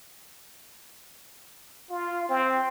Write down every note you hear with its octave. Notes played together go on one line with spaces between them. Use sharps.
F4
C4